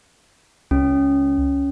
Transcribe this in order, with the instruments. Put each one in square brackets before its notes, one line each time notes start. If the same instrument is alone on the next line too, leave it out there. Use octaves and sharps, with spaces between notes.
[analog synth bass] C#2 [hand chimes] C#4